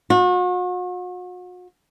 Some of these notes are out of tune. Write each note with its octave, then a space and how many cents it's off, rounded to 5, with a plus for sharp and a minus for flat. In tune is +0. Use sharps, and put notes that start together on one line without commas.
F#4 -40